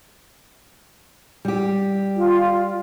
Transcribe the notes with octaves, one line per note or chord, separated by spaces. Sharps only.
G3 G4
F4